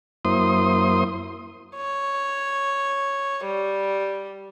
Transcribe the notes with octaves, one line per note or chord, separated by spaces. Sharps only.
F#2 A#3 E4 C5 C6 D#6
C#5
G3